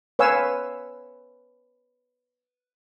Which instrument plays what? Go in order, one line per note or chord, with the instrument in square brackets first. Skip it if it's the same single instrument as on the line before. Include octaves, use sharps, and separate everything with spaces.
[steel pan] B4 C#5 F5 G#5 E6